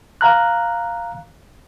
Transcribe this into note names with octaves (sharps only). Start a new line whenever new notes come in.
F5 A#5 F#6